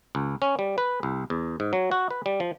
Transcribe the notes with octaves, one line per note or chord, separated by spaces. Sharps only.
C#2
C#4
G3
B4
C2
E2
G#2
F#3
F#4
B4
G3
F3